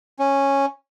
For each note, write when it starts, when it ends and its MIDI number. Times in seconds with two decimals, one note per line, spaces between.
0.19 0.66 61